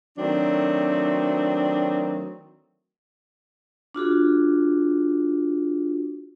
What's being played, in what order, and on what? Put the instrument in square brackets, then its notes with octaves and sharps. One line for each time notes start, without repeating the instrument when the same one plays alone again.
[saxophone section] D#3 F#3 A3 C4 D4
[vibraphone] D4 F4 F#4 G#4